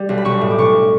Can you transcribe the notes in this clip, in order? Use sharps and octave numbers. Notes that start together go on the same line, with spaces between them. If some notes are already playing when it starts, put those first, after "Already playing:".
Already playing: G3
B1
B5
B1 C#6
A2
D6
B1 C#6